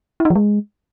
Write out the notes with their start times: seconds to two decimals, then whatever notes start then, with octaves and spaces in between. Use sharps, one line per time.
0.20 E4
0.25 D#4
0.30 F3
0.36 G#3